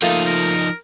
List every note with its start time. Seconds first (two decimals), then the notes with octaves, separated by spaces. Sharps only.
0.02 F3 A3 A#3 D#4 F4
0.26 A#4